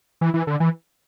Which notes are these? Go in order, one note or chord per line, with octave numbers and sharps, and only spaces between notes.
E3
E3
D3
E3